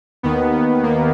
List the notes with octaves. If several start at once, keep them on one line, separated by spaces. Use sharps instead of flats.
D#2 D#3 B3
A#3